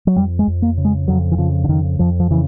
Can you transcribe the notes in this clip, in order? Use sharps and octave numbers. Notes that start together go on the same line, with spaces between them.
F#3
F2 G3
G#3
F2
A#3
C#3
G#3
F2 F#3
E3
C#3 F3
D3
F2 D#3
F2 F3
F3
C#3 E3